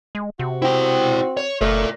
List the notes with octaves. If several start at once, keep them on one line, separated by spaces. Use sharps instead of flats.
G#3
C3 F#4
C4 E4 G5
C#5
F#1 A3 A#4 D5